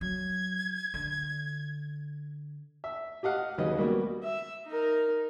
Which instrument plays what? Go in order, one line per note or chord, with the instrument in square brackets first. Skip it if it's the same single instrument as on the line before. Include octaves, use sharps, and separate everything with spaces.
[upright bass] F#3 [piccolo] G#6
[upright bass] D3
[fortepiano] E5
G4 D#5 F5 F#5
D#2 C#3 F#3 B4 D#5
G3 A#3 B3 F#4
[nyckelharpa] E5
D#4 A#4